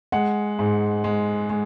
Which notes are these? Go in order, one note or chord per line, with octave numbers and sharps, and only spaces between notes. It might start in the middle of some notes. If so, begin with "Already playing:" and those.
G#3 F#5
G#2
G#3
G#3